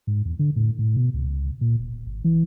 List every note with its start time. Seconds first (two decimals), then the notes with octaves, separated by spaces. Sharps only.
0.07 G#2
0.25 E2
0.39 D3
0.56 A2
0.79 A2
0.96 B2
1.14 C#2
1.61 A#2
1.79 E1
1.92 D1
2.06 G#1
2.24 E3